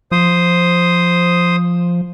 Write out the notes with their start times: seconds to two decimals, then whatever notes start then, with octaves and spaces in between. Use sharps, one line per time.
0.12 F3 C5 D#6